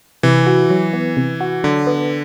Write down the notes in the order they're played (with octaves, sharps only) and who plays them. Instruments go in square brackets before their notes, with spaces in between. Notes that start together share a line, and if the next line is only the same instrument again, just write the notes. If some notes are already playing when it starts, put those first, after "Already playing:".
[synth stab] C3 [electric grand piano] E3
[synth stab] F#4
F#3
B3
C3
F#4
[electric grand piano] D3 [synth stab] F#3
[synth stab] B3